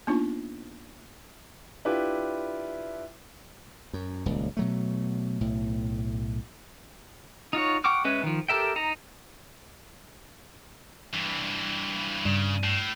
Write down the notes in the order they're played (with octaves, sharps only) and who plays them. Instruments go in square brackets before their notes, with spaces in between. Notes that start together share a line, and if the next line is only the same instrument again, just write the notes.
[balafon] A#3 B3 D4 D#4 F4
[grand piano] D4 E4 F4 G4 B4
[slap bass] F#2
D#1 C#2
B2 F#3 A3
B1 A2
[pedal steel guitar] D#4 F4 F#4 C#5
F#5 G5 C#6 D6 F6
G#3 C#4 B4 E5
D#3 F3
G4 A4 A#4 E5 G5
D#4 A#5
[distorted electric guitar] G2 E3
[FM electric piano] G2 [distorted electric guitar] C#3
[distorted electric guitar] A2